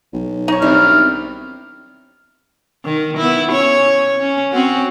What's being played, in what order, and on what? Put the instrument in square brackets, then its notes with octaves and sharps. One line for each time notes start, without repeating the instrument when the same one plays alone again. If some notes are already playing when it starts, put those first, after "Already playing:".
[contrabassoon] B1
[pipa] D#4 C#5
[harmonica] D#3 G3 F6 [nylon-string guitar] C4 D4 E4
[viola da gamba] D#3
B3 E4
C#4 C#5
C#4
C4 C#4 F#4